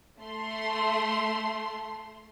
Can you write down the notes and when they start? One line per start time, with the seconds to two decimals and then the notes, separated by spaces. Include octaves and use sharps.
0.20 A3 C6